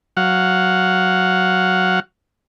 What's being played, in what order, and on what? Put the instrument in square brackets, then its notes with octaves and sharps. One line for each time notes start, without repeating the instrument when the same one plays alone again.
[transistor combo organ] F#3 F5 F#5